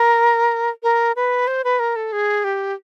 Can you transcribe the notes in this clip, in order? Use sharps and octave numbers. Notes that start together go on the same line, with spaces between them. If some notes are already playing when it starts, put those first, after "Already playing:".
Already playing: A#4
A#4
B4
C5
B4
A#4
A4
G#4
G4